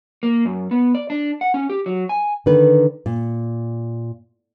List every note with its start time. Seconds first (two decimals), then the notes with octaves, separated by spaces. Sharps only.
0.23 A#3
0.45 F#2
0.71 B3
0.95 D5
1.10 D4
1.41 F#5
1.54 C#4
1.70 G4
1.86 F#3
2.09 G#5
2.46 D3 D#3 B4
3.06 A#2